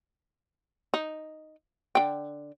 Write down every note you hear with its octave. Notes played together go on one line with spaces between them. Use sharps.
D#4
D3 G5